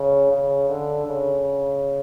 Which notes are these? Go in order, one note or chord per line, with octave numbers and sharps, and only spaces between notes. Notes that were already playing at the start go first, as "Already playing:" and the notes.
Already playing: C#3
C#3
D3
C#3